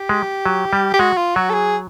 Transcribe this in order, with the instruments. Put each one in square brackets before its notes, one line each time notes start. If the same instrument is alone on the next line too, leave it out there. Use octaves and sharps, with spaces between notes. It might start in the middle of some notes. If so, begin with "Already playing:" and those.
Already playing: [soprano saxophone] G4
[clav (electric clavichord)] G#3
F#3
G3
[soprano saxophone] G4
[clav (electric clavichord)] G#3 [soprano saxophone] F#4
[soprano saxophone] F4
[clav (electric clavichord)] F#3 [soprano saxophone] F#4
[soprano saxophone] A4
G#4